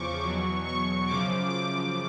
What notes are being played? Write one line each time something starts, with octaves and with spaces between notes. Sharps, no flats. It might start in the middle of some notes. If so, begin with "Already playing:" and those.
Already playing: E2 C#3 F3 C#6 D6
E2 B2 F#3
C#6
F#2 C#3 F3 D6
D6